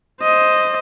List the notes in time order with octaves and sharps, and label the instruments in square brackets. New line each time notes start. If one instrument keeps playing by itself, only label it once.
[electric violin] C5 D#5